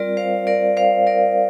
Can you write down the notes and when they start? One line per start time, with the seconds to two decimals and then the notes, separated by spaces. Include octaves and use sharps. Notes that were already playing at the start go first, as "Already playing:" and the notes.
Already playing: G3 C4 F4 A#4 D5
0.17 C5 F5
0.47 A#4 D5
0.77 C5 F5
1.07 A#4 D5